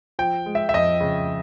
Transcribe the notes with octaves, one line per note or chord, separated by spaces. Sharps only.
F3 G5
G#3
E5
E5
F2 D#5
C#3